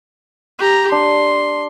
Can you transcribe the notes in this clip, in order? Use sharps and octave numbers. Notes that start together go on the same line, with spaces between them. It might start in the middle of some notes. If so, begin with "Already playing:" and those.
G4 A#5
D4 C6